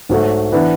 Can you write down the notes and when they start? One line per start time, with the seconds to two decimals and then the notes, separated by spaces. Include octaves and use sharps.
0.09 G#2 F#3 A3
0.52 E3 B3 D4